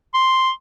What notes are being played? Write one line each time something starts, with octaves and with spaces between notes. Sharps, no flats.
C6